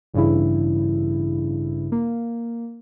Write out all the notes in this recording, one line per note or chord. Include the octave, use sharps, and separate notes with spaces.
A1 G2 C#3 E4
A#3